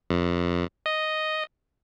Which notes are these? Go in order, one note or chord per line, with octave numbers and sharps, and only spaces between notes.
F2
D#5